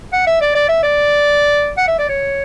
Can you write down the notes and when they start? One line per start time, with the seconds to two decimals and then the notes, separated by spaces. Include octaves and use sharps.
0.13 F#5
0.27 E5
0.41 D5
0.55 D5
0.69 E5
0.83 D5
1.77 F#5
1.88 E5
1.99 D5
2.09 C#5